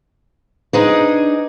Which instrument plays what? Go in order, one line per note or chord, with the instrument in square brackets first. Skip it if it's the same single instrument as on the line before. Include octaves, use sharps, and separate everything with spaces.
[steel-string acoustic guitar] D4 D#4 G#4 [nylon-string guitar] B4 C5